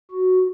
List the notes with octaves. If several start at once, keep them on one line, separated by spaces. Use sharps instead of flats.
F#4